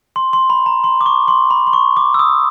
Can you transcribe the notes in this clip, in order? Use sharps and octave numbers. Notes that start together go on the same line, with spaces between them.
C6
C6
B5
A#5
C6
D6
C#6
C6
B5
C6
C#6
D6
E6
D#6